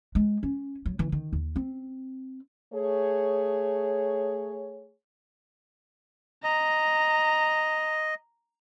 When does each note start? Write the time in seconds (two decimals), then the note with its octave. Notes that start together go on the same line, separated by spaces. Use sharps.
0.15 G#3
0.43 C#4
0.86 F#3
0.99 E3
1.12 D#3
1.33 D#2
1.56 C4
2.73 A3 G#4 C#5
6.44 D#5 A#5